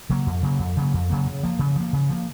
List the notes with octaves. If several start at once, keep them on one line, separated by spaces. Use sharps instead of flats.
C#3 F#3 A#3
F2
C#3 F#3 A#3
F2
C#3 F#3 A#3
F2
C#3 F#3 A#3
C#3
F3 A#3
C#3
F3 A#3
C#3
F3 A#3